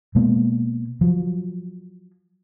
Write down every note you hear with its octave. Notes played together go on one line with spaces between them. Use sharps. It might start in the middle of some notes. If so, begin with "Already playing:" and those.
B2 G#3 A#3 B3
F3 F#3